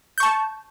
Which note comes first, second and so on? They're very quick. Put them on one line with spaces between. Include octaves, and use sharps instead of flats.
G6 C#6 A5